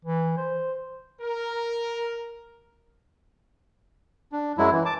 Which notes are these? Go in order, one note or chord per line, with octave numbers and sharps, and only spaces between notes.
E3
C5
A#4
D4
F#2 F#3 G#3 E4
E3
A5 D6